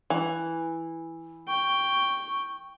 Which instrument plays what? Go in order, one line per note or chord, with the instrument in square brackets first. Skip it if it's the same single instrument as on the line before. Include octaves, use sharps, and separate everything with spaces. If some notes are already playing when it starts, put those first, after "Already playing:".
[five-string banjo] E3
[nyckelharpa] G5 [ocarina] C#6